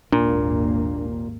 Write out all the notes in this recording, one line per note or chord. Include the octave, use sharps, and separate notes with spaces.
G#1 D#2 A#2 A#3 D4